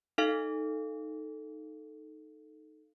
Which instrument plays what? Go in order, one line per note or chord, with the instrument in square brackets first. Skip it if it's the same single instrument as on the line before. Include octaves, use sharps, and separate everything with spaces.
[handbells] D#4 A4 F5